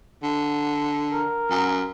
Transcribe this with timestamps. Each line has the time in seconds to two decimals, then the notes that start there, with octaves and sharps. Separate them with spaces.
0.23 D3
1.13 A#4
1.50 F#2